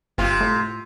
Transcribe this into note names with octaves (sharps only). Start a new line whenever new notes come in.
G1 C3 F4
A2